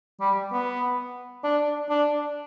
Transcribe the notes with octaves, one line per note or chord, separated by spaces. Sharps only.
G3
B3
D4
D4